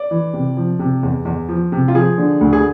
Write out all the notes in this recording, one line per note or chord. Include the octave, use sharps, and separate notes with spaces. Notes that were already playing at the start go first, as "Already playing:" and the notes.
Already playing: D5
E3
C3
F3
C3
E2
E2
F3
C3
F4
F3 G#4
D3
D2
G#4